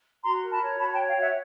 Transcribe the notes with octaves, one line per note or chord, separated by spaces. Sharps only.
F#4 A#5 C6
A#4
A5 B5
C#5
F#4 A5 B5
G5 A5
C#5
F5 G5
F#4 E5 F#5